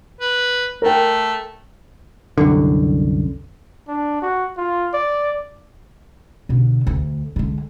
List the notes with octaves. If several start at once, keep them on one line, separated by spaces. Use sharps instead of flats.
B4
A3 A#4 G5
C2 F#2 D3
D4
F#4
F4
D5
B2 D3
D2
D3 G#3